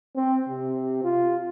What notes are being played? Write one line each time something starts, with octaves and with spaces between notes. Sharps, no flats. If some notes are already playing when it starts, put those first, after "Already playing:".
C4
C3
F4